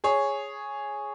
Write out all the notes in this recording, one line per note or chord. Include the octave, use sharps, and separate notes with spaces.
G#4 C#5